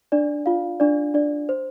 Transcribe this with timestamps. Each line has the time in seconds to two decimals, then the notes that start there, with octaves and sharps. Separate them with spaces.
0.12 D4 D5
0.46 F4 F5
0.80 D4 D5
1.14 D4 D5
1.49 C5